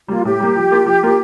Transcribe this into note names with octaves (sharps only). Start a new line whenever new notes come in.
G3 A#3 F4
A2 G4
G3 A#3
F3
A#3 F4 A#4
F3
A#3 F4 A#4